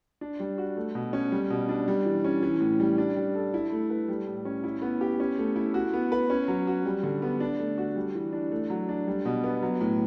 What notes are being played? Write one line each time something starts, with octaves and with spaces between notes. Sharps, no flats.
D4
G3
F#4
A3
B2
C#4
G3
B2
D4
G3
E3
C#4
E3
A2
G3
D4
G3
A4
E4
A3
B4
G3
A2
C#4
E4
B3
G4
C#4
A3
E4
F#4
B3
B4
C#4
F#3
F#4
G3
D3
B3
D4
A3
F#4
G3
E3
D4
A3
F#3
D4
G3
B2
B3
F#3
A2